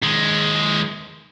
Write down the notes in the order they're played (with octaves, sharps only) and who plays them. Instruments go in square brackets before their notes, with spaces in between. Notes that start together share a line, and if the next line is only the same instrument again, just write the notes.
[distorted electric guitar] D#2 G#3